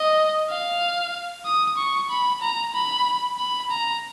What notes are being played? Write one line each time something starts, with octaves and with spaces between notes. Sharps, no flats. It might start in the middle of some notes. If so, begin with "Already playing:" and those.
Already playing: D#5
F5
D#6
C#6
B5
A#5
B5
B5
A#5